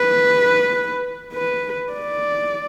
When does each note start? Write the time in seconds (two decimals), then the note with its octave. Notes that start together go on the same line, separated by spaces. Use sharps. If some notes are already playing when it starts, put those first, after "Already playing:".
Already playing: B4
1.33 B4
1.93 D5